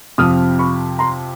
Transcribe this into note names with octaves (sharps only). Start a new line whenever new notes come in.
F2 C3 F3 D#6 F6
B5 C#6
A#5 C6